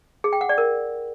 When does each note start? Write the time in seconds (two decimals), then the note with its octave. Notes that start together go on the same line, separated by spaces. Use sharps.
0.24 G#4
0.33 G5
0.41 F#5
0.49 D5
0.58 A#4